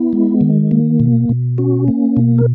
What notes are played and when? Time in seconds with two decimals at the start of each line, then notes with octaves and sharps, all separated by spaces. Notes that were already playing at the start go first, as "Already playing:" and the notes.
Already playing: B3 E4
0.13 G#3
0.41 D#3
0.71 A#3
1.00 B2
1.29 B2
1.58 C#4 F#4
1.88 A#3
2.17 B2
2.38 A#4